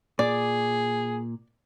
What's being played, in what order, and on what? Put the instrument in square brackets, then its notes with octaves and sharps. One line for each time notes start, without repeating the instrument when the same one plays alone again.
[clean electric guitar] A#2 [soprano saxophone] G#4 [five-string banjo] D5